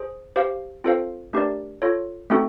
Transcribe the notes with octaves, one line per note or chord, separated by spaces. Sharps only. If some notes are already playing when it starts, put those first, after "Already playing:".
Already playing: G#4 C5
G4 C5 F5
C4 F4 A4 C5 F5
A3 D4 G4 A#4 D5
F4 A4 C#5
A3 C4 D#4 F#4 A4